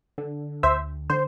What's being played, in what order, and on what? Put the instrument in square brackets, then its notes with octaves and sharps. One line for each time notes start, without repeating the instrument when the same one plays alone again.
[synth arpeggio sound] D3
D2 C5 E5
D3 C5